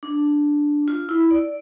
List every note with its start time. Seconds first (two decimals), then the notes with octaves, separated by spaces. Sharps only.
0.03 D4
0.88 F4
1.09 E4
1.31 D5